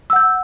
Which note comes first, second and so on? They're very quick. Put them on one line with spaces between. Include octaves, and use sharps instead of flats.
E6 F#5 G6